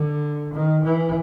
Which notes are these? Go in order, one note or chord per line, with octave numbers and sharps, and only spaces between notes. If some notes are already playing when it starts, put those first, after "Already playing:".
Already playing: D3
D#3
E3